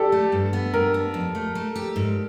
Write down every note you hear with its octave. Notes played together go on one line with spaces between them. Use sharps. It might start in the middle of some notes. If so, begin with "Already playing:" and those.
Already playing: G4 A4 D5
A3
G2
B3
G2 A#4
B3
F2
A3
A3
G4
G#2